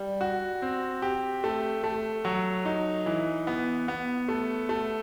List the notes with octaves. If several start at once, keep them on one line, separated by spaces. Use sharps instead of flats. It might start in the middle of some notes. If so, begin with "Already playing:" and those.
Already playing: G3
F#4
C4
G4
A3
A3
F#3
D#4
E3
B3
B3
A3
A3